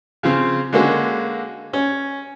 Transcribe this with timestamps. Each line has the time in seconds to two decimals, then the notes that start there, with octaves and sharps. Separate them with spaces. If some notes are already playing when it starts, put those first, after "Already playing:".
0.23 C#3 F3 C4
0.73 D3 G#3 A#3 C#4 F#4
1.73 C#4